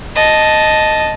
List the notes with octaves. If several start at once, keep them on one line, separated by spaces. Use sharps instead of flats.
D#5 A5